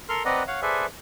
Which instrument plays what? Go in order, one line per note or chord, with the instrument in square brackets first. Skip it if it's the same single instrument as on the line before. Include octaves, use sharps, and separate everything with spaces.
[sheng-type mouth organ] A4 A#4 C6 F6
C4 B4 D5 D#5 F#5 A#5
C#5 F5 F#5
G#4 A4 B4 C5 D5 E5